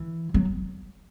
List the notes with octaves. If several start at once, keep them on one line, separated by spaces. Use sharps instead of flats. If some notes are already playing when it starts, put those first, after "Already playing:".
Already playing: E3
F#3